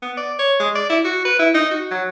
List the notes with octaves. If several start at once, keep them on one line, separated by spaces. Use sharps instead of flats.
B3
D5
C#5
G#3
D5
E4
F#4
B4
E4
D#4
F#4
F#3